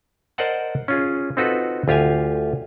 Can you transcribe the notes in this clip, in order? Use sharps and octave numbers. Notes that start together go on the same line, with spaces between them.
A#4 C5 D5 D#5 F#5 A5
C#4 F4 G#4
C4 D#4 F4 F#4 A4 B4
D2 F4 G4 F5 G#5